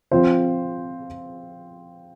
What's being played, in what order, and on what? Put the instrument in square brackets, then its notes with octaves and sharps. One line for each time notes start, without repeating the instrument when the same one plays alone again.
[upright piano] F3 C4 F4 C5